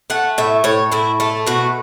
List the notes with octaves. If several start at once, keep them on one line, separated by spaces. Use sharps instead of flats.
A3 F#5
A2 E5
A2 C#5
A2 E4
A3 A4
B2 F#4